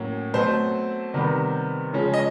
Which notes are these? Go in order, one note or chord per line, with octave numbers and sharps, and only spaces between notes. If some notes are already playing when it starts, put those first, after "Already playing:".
Already playing: A2 F#3 A#3 C#4
B2 F#3 A3 C4 C5
C3 D#3 G3 B3
C#3 F3 G#3 C#4
D#5